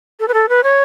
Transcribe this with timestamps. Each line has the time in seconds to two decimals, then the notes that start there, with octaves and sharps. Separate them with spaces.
0.20 A4
0.28 B4
0.34 A4
0.49 B4
0.64 C#5